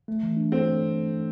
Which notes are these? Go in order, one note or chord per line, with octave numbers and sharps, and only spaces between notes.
A3
E3
D4
C4 A4